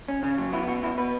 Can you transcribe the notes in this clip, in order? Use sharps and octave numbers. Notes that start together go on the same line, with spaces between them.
C#4
C#3 C#4
F#3
B3 E4
B2 F#4
B2 E4
B3 B4